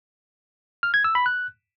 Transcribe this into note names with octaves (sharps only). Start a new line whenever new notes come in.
F6
G#6
E6
B5
F#6